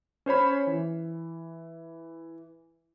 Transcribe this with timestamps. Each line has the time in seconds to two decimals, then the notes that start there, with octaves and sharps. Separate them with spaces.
0.26 C#4 C5 C#5 B5
0.67 E3